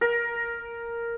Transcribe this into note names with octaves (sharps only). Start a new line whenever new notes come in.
A#4